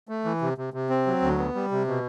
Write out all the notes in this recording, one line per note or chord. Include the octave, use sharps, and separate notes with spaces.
A3
E3
C3
C3
C3
C4
F#3
D2
B3
G3
C3
B2